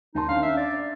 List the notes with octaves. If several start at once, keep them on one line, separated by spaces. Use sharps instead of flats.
D#2 D#4 A5 C6
C#4 D4 F5
E5
D5